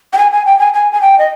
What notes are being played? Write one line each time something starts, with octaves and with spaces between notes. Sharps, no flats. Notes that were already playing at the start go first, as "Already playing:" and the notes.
G5
G#5
G#5
G5
G#5
G#5
G#5
G5
D#5